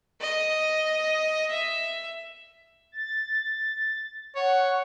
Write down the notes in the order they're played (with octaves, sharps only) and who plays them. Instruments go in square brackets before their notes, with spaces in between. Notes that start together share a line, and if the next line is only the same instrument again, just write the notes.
[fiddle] D#5
E5
[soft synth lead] A6
[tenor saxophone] C#5 [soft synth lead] F#5